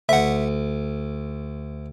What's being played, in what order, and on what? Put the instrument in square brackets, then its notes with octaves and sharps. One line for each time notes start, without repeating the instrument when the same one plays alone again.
[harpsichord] D2 [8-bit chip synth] E5 F#5